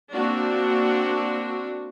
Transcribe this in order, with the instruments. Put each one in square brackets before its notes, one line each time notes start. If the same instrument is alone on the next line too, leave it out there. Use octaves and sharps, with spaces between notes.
[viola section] A#3 C4 D4 F#4